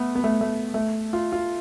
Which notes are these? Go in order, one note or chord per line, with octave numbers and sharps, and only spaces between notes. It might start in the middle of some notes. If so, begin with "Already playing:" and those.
Already playing: A3 B3
B3
A3
A3
A3
F4
F4